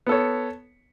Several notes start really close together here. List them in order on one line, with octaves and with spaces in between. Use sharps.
B3 A4 C#5